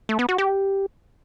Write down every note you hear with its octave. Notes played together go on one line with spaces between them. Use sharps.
A3
B3
F#4
G4